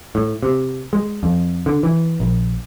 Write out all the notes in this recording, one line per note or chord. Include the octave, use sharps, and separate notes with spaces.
A2
C3
G#3
F2
D3
E3
A#1